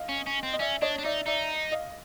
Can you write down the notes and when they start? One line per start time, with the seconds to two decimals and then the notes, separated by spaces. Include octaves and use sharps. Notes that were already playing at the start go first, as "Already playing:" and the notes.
Already playing: D#5 F5
0.09 C#4
0.27 C#4
0.43 C4
0.53 D#5
0.59 C#4 D5 E5
0.82 D4 C#5 D#5
0.98 D4
1.04 D#4 D5 E5
1.26 D#4 D5 E5
1.71 D#5 F5